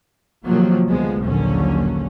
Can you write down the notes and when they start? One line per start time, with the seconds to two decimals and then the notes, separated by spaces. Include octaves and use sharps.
0.44 C3 D#3 F3 F#3 A#3
0.88 D2 F3 G#3 B3
1.22 A#1 D#2 D3 F#3 C#4